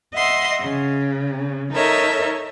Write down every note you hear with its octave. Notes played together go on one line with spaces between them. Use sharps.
D#5 E5 F#5 C6
C#3
D#4 A4 A#4 C#5 D#5 E5